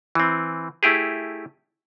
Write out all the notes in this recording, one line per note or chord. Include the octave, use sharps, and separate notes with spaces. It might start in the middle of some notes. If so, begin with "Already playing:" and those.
E3 C4
A3 E4 G4 G#4